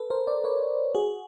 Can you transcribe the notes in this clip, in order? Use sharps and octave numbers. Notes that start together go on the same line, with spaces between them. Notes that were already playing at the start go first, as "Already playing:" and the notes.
Already playing: A4 B4
A#4 C5
C5 D5
B4 C#5
F#4 G#4